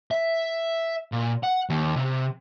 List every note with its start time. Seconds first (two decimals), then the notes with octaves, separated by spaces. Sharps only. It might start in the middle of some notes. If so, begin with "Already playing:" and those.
0.11 E5
1.12 A#2
1.43 F#5
1.70 D#2
1.97 C3